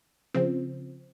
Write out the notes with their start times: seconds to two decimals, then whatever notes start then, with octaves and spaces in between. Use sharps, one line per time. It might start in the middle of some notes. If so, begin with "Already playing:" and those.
0.34 C#3 F3 C4